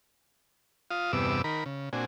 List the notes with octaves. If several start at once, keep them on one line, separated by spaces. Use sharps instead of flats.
F4 F5 D#6
E2 G2 C3 B3 D6 E6
D#3 A#4 B5
C#3
A#2 C4 D4 F#4 G#5